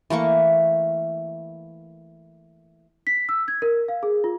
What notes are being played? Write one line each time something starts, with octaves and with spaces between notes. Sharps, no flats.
E3 A3 A#3 C#6
B6
E6
G#6
A#4
F5
G#4
F4